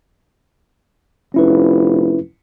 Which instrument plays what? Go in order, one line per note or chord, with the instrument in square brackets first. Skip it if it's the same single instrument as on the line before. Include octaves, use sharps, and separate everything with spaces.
[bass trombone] F1 [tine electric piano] C#4 E4 B4